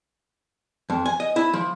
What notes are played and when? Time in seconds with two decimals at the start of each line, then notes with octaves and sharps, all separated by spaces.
0.90 F2
1.06 G#5
1.20 D#5
1.36 E4
1.53 F3